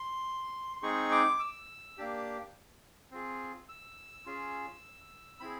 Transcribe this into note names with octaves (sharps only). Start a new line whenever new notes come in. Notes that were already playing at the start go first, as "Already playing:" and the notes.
Already playing: C6
C6
G#3 C4 D#4 G#4 C#6
D6
E6
A#3 D4 G4
C4 F4 G#4
E6
C#4 F4 G#4
C4 E4 G#4 B5